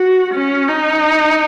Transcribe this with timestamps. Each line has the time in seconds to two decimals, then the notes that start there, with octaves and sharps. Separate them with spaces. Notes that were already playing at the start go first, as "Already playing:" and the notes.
Already playing: F#4
0.34 C#4
0.68 D#4